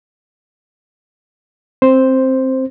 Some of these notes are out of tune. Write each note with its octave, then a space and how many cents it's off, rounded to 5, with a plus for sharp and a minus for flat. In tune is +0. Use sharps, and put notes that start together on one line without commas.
C4 +10 C5 +0